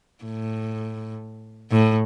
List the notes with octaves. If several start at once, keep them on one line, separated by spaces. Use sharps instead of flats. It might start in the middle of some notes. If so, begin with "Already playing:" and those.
A2
A2